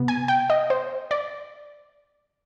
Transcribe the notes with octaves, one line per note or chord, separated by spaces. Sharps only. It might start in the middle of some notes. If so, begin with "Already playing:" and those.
Already playing: C3 B3
G#5
G5
D#5
C5
D5